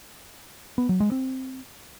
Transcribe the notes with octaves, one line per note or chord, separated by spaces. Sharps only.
B3
F#3
G#3
C4